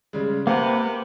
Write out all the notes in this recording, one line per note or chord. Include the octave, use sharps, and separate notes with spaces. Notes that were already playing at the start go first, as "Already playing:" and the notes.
C#3 G3 G#3
C3 A#3 C4 B4 F5 F#5